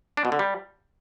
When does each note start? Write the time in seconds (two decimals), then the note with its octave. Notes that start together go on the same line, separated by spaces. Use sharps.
0.17 D4
0.25 B2
0.32 D3
0.39 G3